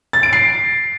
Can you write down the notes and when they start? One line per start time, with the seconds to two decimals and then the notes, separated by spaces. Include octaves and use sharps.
0.13 A6
0.23 D7
0.33 C7